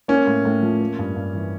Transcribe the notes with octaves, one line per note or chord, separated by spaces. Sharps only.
A#3 C#4
A2
A2
F3
A#3
G2
G2
E3